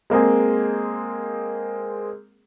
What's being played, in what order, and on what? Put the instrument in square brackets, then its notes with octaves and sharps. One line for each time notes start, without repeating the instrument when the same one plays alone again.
[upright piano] G#3 A#3 C4 G#4